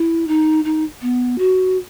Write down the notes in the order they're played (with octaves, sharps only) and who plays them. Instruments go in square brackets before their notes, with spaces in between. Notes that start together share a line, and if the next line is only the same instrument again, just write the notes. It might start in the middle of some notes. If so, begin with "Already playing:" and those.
Already playing: [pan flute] E4
D#4
D#4
B3
F#4